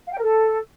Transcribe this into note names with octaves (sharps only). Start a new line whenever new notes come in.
F5
G5
A#4
A4